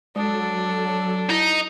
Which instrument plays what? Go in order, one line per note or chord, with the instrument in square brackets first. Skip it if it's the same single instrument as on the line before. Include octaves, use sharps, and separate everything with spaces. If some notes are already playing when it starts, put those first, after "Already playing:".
[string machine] F#3 A4 [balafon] G#3 [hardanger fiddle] D4
[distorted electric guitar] D#4 [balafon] E4